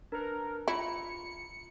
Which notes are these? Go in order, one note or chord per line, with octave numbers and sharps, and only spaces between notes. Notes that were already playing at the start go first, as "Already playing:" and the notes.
D4 A#4 B4
E4 F4 A#5 B5 C#7